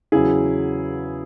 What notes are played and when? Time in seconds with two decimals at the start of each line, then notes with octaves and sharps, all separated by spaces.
0.12 E2 C#3 F#3 E4 G#4